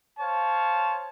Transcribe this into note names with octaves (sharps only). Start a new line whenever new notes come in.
C5 C#5 F5 A5